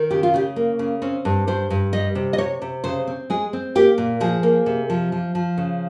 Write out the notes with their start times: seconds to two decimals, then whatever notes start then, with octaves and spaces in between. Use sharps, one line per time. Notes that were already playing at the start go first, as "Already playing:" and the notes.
Already playing: D#3
0.11 C#3 G4
0.23 F4
0.34 C#3 G4
0.56 A#3
0.79 C#3
1.02 C4 C#4
1.25 G2
1.48 G2 C5
1.70 G2
1.93 G3 D#5
2.15 C3
2.33 D#5
2.38 C3 C#5
2.62 C3
2.84 C#3 C5
3.07 C4
3.30 G#3 G#4
3.53 C4
3.75 A#3 G4
3.98 A#2
4.20 F3 G#4
4.43 A#3
4.66 C3
4.90 F3
5.12 F3
5.35 F3
5.58 C#3